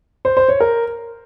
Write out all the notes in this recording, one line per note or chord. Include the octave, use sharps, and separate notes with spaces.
C5
C5
C#5
A#4